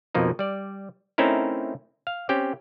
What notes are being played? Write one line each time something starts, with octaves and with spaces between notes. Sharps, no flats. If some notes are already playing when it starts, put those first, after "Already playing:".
F2 B2 F3 A#3 D#4
G3 D5
A3 C4 C#4 D#4 E4 A#4
F5
C4 C#4 G4 G5